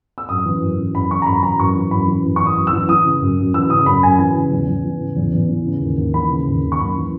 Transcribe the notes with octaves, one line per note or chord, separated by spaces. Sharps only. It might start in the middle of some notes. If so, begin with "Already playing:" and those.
E6
F#2 D#6
E3
F#2
E3
F#2 B5
E3 C#6
A#5
F#2 B5
E3 A#5
F#2 C#6
E3
F#2 B5
E3
F#2
E3 C#6
D#6
F#2
E6
E3
E3 D#6
C#3
F#2
F#2
E3 E6
C#3 D#6
F#2 B5
F#2 G#5
E3 G#5
C#3
E2
E2
E3
C#3
E2
E2
E3
C#3
D#2
D#2
E3 B5
C#3
D#2
D#2
C#6
F#2 B5
E3